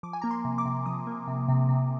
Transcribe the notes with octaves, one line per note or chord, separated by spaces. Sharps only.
F3 D6
G#5
A#3 A#5
C6
C3
D6
C3
F3 D#6
A#3
C3
C3
C3